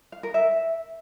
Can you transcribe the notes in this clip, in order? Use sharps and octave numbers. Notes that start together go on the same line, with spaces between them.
F5
A#4
E5